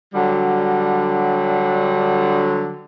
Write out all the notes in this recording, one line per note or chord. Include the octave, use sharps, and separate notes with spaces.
D3 F#3 G3